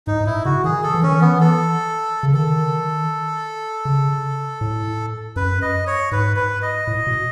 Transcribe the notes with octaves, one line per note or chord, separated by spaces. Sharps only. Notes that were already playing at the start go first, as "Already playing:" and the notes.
G#2 D#4
G#2
A2 E4
C#3 F#4
D#3 G#4
A4
E3
D#3 C#4
E3
B3
A4
C#3
D#3 A4
C#3
A2
F#2 B4
D#5
C#5
G#2 B4
B4
D#5
A2
B2